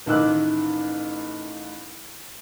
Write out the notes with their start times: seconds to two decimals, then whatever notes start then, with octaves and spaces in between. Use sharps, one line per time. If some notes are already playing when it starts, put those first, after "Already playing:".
0.06 A1 D#3 D#5 D6 E6 F#6